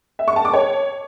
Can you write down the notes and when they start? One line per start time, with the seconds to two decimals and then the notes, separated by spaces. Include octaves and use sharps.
0.19 E5
0.28 C#6
0.36 A5
0.45 D6
0.53 C#5